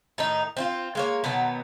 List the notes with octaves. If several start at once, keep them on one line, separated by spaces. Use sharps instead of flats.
A2 D#3 D#4
C4 E4 F4
G#3 A#3 C#5
B2 D#3 F#3 B3